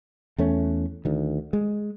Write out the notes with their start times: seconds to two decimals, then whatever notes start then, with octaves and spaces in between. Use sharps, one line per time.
0.38 E2 A3 C#4
1.05 D2 D#3
1.53 G#3